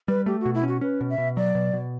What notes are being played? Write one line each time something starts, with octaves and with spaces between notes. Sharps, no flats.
G3 B4
A3 G4
F#4
B2
E4
C#4 F#4
C#4 B4
B2
E5
B2
F#3 D5
B2
B2